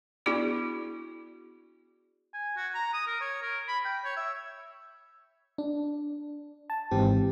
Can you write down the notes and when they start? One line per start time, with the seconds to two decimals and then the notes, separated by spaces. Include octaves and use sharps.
0.26 B3 D4 E4 F#4 G#4 D5
2.34 G#5
2.57 F#4
2.74 A#5
2.94 D#6
3.07 A#4
3.21 C#5
3.42 A#4
3.68 B5
3.85 G5
4.05 C#5
4.17 E5
5.58 D4
6.70 A5
6.91 G#1 G#2 E3 C4 G4